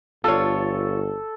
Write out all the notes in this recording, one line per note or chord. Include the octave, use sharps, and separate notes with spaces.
G1 F4 A4 C#5